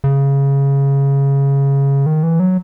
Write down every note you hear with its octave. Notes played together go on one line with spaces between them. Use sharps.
C#3
D#3
E3
F#3